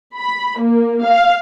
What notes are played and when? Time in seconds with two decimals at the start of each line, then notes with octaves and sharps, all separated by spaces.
0.17 B5
0.61 A#3
1.07 F5